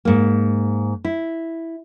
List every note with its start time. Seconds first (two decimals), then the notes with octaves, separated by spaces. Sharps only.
0.05 G#2 A#3
1.05 E4